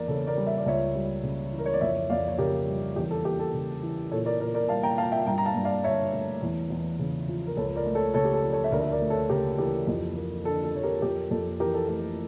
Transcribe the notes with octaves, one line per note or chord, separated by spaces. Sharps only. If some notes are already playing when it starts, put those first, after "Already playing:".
Already playing: E2 A#3 A#4 D5
C#3 A4 C#5
A#4 D5
G3
E5
D5
C#2 C#5 E5
G3
C#3
E3
A#4
C#5
D5
F2 C#5 E5
F2 D5 F5
C#5
C#3 G4 A#4
G3
E2 G4
A4
A#3 G4
A4
C#3
E3
A#2 A4 C#5
A#4 D5
A#2 A#4 D5
A#4 D5
G3 F5 A5
G5 A#5
A#3 F5 A5
E5 G5
G2 G5 A#5
A#5
F5 A5
G2
D5 F5
D3 C#5 E5
A3
E2
E2
C#3
F3
A#4
C#2 A4 C#5
A#4 D5
A3
A4 C#5
C#3 A4 C#5
G4
A4
F3
A4 C#5
E5
D2 A#4 D5
E5
A#4 D5
A3
A4 C#5
C#3 G4 A#4
E3 G4 A#4
F2
A#3
D3 A4
A4
F3 C#5
G4 A#4
F2 G4 A#4
F2 A4
E3 G4 A#4
A4
A3 G4